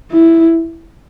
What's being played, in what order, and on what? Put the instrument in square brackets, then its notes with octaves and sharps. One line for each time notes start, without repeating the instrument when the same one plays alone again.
[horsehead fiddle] E4